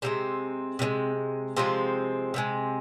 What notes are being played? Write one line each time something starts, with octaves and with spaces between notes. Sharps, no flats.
C3 F3 G#3 C4
C3 F3 G#3
C3 F3 G#3 C4
C3 F3 G#3